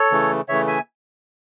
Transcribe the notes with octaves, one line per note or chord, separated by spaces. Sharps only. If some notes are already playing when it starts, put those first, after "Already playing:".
Already playing: A4 C#5
C#3 E3 A3
C#3 E3 A3 C#5 E5
E5 G#5